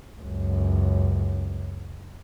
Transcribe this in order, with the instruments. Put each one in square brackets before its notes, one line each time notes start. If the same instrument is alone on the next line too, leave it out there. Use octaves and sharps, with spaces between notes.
[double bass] C#2 F#2